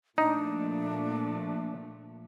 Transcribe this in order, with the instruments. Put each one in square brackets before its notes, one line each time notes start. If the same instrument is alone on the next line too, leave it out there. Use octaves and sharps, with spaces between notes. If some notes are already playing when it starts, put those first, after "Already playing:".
[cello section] A#2 F3 A3 [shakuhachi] D4 [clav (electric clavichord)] D#4